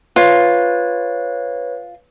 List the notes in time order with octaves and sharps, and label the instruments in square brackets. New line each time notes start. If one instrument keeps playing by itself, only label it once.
[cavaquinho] F4 [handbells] B4 C#5